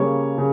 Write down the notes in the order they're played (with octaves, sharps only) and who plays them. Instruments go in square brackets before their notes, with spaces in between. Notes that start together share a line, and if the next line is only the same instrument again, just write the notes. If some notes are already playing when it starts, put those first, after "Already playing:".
Already playing: [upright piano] C#3 G3 A#3 C#5
C#3